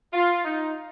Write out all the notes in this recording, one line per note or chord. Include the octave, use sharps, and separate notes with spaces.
F4
D#4